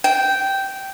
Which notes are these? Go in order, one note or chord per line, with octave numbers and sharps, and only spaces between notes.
G5